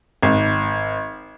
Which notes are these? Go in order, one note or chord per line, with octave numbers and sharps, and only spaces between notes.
G#1